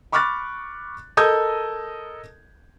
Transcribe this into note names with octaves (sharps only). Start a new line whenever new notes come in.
B5 C#6 D6 F6 F#6 A6
A4 A#4 D#5 D#6 G6 G#6